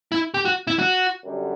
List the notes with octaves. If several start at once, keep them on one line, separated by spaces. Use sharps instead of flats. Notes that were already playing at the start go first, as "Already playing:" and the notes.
E4
G4
F#4
E4
F#4
F#2 D3 G3